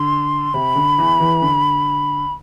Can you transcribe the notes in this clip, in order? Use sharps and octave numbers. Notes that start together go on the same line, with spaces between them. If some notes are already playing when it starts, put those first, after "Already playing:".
Already playing: D3 C6
C3 B5
D3
E2 E3
E2 E3
D3